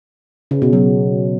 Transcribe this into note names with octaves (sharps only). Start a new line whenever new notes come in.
C#3
B2
F#3